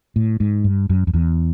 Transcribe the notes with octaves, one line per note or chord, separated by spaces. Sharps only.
A2
G#2
G2
F#2
F2
E2